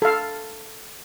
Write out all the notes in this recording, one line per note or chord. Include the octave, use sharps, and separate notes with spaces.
A4 F5